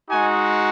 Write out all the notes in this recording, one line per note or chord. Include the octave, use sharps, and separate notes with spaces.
G#3 D#4 F#4 G#5